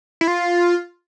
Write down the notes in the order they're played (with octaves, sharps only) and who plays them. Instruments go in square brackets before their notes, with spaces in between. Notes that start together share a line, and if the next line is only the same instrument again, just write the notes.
[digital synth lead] E4
F4